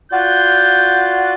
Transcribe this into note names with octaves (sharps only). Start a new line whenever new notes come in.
F4 F#4 D5 F#5 G6